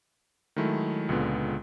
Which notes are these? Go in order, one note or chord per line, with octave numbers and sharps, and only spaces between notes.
D#3 F#3 G#3 A3 E4
C#2 A#2 D3 G#3 B3